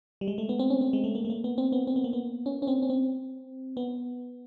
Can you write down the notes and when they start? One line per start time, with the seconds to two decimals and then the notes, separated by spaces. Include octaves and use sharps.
0.21 G3
0.28 G#3
0.38 A3
0.49 B3
0.59 C4
0.70 C#4
0.81 C4
0.93 G#3
1.04 A3
1.15 A#3
1.25 A3
1.30 A#3
1.44 B3
1.58 C4
1.72 B3
1.87 C4
1.96 B3
2.04 A#3
2.13 B3
2.46 C#4
2.62 C#4
2.67 C4
2.82 C#4
2.90 C4
3.77 B3